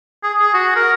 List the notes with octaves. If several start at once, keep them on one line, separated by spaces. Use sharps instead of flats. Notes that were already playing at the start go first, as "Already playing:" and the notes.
G#4
G#4
F#4
A#4